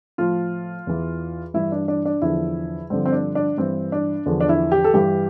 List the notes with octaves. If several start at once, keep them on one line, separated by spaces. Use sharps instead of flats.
A2 F3 F4
E2 E3
G2 E3 E4
D4
D4
D4
E2 D3 F3 E4
G2 D3 F3 C4
C4
D4
D4
G2 E3 C4
D4
E2 D3 F3
D4
E4
G4
A4
G2 E3 G4